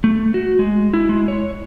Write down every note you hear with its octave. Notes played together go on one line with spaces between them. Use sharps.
A3
F#4
G#3
E4
G#3
C#5